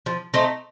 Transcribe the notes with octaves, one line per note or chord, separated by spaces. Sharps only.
F3
A3 C4 D#4